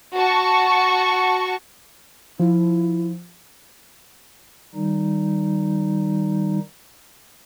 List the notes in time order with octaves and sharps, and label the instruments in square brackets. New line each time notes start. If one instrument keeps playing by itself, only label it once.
[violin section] F#4 A5 C#6
[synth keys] F3 [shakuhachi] E4
[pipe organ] D#3 G3 D#4